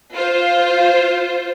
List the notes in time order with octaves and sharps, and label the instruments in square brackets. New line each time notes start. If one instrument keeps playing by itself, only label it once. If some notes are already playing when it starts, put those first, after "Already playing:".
[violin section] F4 C5